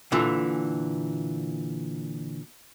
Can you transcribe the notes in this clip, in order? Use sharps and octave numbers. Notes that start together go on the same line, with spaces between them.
A#2 D3 E3